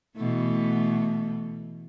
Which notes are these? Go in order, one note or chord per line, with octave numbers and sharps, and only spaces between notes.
B2 E3 A3